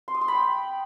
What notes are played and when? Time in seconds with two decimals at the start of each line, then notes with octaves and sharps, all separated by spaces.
0.08 C6
0.15 D#6
0.21 C6
0.28 B5
0.35 G5